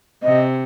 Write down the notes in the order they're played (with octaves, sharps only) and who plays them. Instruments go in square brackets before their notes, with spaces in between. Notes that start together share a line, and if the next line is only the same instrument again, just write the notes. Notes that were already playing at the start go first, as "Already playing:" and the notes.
[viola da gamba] C3 [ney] D#5